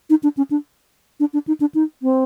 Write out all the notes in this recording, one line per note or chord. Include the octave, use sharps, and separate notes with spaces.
D#4
D4
C#4
D4
D4
D4
D#4
D4
D#4
C4